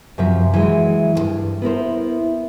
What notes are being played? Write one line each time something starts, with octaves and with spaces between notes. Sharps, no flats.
F#2 C3 F3 E5
E3 F#3 G#3
D2 G2
B3 E4 A#4 C5